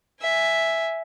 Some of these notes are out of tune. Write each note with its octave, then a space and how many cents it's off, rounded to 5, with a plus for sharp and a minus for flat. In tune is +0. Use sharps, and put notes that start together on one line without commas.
E5 +0 G#5 +0